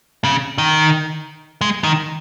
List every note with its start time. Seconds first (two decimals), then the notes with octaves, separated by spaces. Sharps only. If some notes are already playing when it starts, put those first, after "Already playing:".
0.24 C#3
0.58 D#3
1.61 G#3
1.84 D#3